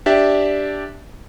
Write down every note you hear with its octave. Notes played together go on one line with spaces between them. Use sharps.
D4 G4 D5 E5